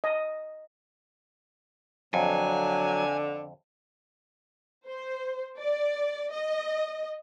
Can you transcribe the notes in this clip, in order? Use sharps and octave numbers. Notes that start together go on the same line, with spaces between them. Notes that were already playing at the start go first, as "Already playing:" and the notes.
D#5
F2 D3 F#3 G#5
C5
D5
D#5